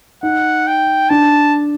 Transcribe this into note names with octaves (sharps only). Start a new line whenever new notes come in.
D#4 F#5
G5
D4 A5